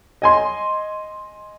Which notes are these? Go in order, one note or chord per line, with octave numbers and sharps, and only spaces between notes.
D#5 G#5 C6